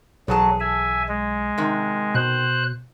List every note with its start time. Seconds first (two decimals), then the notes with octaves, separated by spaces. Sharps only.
0.28 B1 E2 F#3 G#4 A5
0.60 E5 G#5
1.08 G#3
1.58 C3 D#3
2.15 B2 C5 F#6